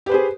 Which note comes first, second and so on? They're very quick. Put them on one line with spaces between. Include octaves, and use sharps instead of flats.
G4 B4 C5 G#4